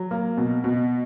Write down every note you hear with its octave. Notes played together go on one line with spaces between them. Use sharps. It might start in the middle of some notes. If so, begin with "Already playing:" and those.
Already playing: F#3
A#3
B2
B2